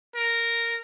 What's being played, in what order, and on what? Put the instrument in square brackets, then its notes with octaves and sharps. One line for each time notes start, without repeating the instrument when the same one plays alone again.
[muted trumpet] A#4